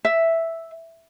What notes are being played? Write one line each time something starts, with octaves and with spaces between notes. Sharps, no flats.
E5